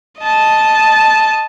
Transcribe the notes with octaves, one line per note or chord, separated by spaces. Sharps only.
D#5 A5